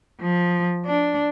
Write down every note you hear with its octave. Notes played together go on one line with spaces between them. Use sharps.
F3
D4